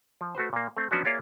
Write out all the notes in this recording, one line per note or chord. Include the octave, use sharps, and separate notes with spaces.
F3
A3 F#4 B4 C5
A#2 A#3
A3 C4
F3 F#3 B3 C#4 D4 F#4
A#3 F4 G#4 C#5 D5 E5